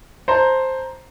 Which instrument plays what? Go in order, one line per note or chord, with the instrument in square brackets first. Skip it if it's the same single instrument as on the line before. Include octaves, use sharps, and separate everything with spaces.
[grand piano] C5 A5 A#5